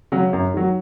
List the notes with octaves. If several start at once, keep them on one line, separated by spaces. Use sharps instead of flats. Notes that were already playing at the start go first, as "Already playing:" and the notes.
C#3 F#3 C#4
F#2
D#3 F#3